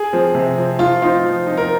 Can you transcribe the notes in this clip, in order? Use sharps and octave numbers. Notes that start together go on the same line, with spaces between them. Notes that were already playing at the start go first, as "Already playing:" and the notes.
Already playing: G#4
F3 C4
C3
F3 C4
F3 F4
C4 D#4 F4
F3
C4 D#4
A#4